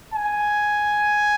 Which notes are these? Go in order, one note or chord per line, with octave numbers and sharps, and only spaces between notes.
G#5